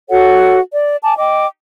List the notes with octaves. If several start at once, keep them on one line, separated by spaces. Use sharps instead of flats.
F#4 A4 C#5 F#5
D5
G#5 A5 D6
D#5 G5 D6